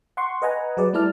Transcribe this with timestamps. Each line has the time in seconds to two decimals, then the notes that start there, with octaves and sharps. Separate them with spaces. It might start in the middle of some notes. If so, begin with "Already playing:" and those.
0.17 F#5 C6 C#6
0.42 B4 D#5 F#5 G#5 A#5
0.77 F#3 G#4 B4 D5
0.93 G3 A3 E4 D5 A5 F6